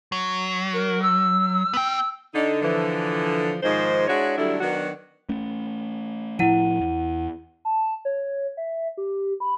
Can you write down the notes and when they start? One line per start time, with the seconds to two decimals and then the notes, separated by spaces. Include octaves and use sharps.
0.12 F#3
0.73 A#4
1.01 E6
1.73 B3 G5
2.34 D3 D#4
2.62 D3 E3 F3
3.63 G#2 D#3 F3 G#3 C5
4.07 G#3 D4 E4 F#4 C#5
4.37 D3 F#3 G3 A3 D4 E4
4.60 D#3 F#3 B3 D4 F#4 F#5
5.29 A3 C#4
6.39 A2 F3 E4 F#5 D#7
6.80 E2
7.65 A5
8.05 C#5
8.57 E5
8.97 G4
9.40 B5